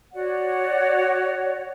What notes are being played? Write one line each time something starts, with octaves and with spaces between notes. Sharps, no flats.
F#4 C#5 D5 F#5